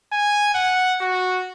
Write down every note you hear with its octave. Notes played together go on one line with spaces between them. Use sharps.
G#5
F#5
F#4